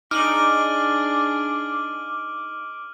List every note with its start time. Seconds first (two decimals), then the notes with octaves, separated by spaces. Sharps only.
0.11 D4 D#4 G#4 D6 F6 D#7 F#7